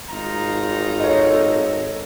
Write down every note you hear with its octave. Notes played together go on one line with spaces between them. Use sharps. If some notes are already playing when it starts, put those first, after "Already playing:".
G#1 D#4 F4 A#5
A4 C#5 D#5